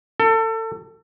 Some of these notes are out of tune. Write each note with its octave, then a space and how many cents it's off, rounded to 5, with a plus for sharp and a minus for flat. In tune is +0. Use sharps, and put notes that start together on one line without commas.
A4 +30